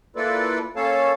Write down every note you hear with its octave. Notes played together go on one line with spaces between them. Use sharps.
A#3 E4 F4 A4 B4 D5
A#3 C#4 A4 C#5 F5 A5